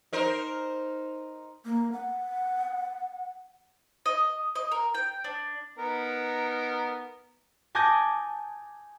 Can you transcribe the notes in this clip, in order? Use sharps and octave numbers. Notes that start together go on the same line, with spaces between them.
D#4 A#4 C5
A#3
F#5
D#5
D#5
A#4
G5
D4
B3 D#4 A#4
G#5 A5 D6 D#6 G6 A#6